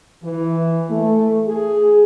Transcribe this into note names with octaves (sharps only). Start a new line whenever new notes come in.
E3
A3
G#4